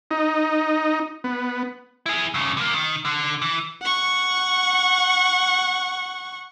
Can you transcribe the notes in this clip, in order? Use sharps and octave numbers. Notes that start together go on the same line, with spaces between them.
D#4
B3
E4 G#4
G2 C#3
D3 A#3
D#3
D3
E3
F#5 C#6